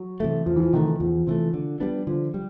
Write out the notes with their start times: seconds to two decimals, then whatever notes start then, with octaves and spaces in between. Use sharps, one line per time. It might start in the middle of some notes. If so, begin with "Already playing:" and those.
Already playing: F#3
0.20 C3 E3 A3
0.46 E2 F3
0.56 E3
0.60 F3
0.73 C3 D#3 E3 A3
1.00 E2 F3
1.27 C3 E3 A3
1.54 D3
1.80 G3 B3 D4
2.07 D3 F3
2.34 G3